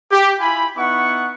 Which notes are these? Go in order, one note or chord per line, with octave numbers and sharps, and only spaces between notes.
G4
E4 F4 G#5 B5
B3 D#4 E4 F#5 C#6